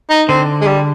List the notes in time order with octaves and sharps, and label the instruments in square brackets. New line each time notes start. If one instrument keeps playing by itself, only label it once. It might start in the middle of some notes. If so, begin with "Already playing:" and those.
[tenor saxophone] D#4
[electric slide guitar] D3 [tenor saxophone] C4
[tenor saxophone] G#3
G3